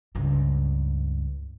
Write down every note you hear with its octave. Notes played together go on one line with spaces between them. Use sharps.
C#2 G2